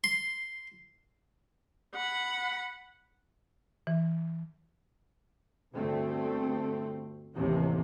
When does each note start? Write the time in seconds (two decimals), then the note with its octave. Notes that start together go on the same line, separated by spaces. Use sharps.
0.04 C6
1.95 F#5 B5
3.87 E3
5.73 G1 D2 A3 C4
7.35 A1 D#2 A2 C3 E3